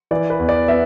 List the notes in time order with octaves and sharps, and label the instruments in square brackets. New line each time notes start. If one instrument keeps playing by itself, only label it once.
[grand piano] E3 D5
B4
E2
D5
B3 E5